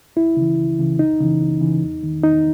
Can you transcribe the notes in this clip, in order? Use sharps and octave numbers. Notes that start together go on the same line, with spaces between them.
C#2 E4
C#3 E3
C#2
C#3 E3
C#2 D#4
C#3 E3
C#2
C#3 E3
E2
D#3
E2 D#4